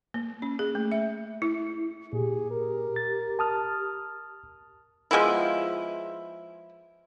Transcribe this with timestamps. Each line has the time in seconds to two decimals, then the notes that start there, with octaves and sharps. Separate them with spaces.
0.14 A#3
0.42 C#4
0.59 G#4
0.75 A3
0.92 E5
1.42 E4
2.13 A#2 G4 G#4
2.51 A#4
2.96 A6
3.39 A5 D#6 F6
5.11 F3 G#3 B3 E4